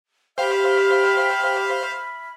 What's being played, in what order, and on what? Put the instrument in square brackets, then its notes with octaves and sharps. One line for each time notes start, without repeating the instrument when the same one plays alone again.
[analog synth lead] G4 [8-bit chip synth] C5 F5 [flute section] E5 B5 F6